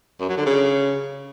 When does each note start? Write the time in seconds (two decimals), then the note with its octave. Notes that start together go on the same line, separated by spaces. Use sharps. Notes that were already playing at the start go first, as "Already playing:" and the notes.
0.20 F#2
0.29 F#3
0.37 D3
0.46 C#3